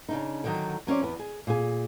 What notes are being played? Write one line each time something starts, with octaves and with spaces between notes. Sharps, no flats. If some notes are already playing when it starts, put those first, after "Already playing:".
C#3 D4 D#4
D3 D#3 F#3
F#3 C#4 C5 D5
E2 B3
G#4
A#2 G#4